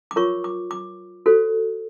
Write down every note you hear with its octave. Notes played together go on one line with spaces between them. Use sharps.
D6
F4 A#4 C#5 C#6
D6
D6
F#4 A4 C5